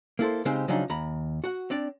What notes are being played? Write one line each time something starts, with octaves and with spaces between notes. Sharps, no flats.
A#3 E4 A4 C5
C#3 G#3 C4 D#4 G4 C5
C#3 F3 F#3 D4 D#4
D#2 A#5 B5
F#4 F#5
C4 D4 D5